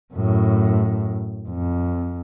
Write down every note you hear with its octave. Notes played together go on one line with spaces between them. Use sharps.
F#2 A2
F2